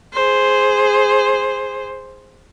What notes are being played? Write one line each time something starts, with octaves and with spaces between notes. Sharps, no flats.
G#4 C5